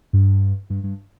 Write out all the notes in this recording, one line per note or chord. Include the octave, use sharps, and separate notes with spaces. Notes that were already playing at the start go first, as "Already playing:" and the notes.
G2
G2
G2